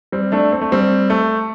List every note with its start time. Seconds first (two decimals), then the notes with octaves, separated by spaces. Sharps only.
0.12 G3 C4
0.32 A3 D4
0.52 C4
0.61 A3
0.72 G3 C4
1.10 A3